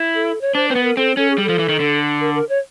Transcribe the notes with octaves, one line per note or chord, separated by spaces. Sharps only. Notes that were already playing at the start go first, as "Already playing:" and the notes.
Already playing: E4
A4
C#5
D4 C5
C4 B4
B3
A#4
C4 A4
C#4 A4
G#4
G3
A4
F3
E3
D#3
D3
A#4
A#4
C#5